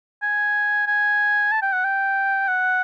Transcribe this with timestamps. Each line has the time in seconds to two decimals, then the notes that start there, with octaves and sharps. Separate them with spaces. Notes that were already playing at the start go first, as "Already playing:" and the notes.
0.22 G#5
0.87 G#5
1.52 A5
1.62 G5
1.73 F#5
1.85 G5
2.48 F#5